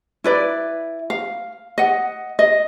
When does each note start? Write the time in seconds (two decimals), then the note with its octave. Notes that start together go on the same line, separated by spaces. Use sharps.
0.24 E4 B4 D5
1.10 F5
1.78 D#5 F#5
2.39 D#5